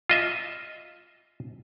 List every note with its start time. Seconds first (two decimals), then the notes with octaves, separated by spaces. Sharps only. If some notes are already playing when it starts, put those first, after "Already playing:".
0.10 F4 D#5 E5